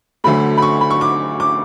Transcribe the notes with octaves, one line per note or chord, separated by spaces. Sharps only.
D2 D3 F#3 A3 B5
B5
C#6
B5
C#6
D6
D6